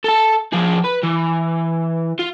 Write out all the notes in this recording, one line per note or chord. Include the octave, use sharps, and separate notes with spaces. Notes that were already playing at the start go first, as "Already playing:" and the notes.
A4 A5
F3 G#4
B4
E3
F4